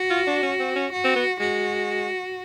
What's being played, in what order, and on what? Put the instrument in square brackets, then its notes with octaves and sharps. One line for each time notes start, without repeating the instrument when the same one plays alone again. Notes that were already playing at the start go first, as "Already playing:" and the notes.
Already playing: [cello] F#4
[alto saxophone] F4
D4
C#4
C4
C#4
[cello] F#4
[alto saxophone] C4
B3
[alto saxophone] G#3 [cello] F#4